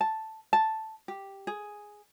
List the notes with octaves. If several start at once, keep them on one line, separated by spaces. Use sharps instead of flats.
A5
A5
G4
G#4